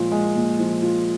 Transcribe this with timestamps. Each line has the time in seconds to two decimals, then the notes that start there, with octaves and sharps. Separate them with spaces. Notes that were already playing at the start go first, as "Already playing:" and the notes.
Already playing: A#2 F3 G#3 F4
0.12 G#3
0.35 A#2
0.59 F3
0.82 F4